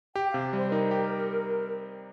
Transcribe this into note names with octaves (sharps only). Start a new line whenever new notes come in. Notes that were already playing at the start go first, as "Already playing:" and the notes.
G4 G5
C3 F5
G3 C5
D#4 A#4
G4